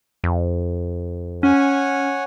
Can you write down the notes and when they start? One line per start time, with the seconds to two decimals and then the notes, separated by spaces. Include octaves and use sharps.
0.24 F2
1.43 C#4 C#5 F#5 G#5